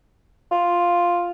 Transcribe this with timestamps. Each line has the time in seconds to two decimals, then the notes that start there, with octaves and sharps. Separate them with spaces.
0.51 F4